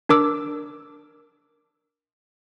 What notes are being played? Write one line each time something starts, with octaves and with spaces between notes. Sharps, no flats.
D4 A#4 D6 E6